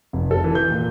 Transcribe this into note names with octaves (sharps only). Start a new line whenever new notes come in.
F1
A4
E3
G6
A#2